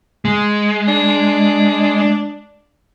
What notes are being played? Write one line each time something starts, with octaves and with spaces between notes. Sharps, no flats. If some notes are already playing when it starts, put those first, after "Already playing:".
G#3
D4